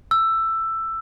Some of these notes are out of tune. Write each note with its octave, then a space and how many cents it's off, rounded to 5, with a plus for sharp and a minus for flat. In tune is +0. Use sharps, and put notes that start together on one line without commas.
E6 +10